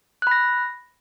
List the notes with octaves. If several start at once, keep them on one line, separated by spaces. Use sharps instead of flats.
B5 F#6 A#6